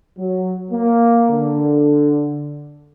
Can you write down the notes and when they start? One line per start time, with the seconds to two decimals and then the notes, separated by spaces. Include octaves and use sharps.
0.18 F#3
0.72 A#3
1.30 D3